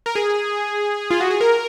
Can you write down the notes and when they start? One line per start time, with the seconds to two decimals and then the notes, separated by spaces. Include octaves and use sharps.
0.06 A#4
0.15 G#4
1.11 F4
1.20 F#4
1.30 G#4
1.41 A#4